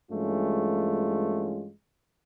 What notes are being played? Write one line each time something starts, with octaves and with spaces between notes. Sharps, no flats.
G2 E3 G#3 A3 C#4 F4